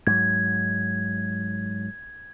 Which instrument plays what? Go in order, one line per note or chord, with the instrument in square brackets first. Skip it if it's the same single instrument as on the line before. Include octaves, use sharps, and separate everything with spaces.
[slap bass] G#2 F#3 [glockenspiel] G#6